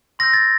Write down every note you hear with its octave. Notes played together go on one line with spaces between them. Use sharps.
C6 E6 G6 A#6
A6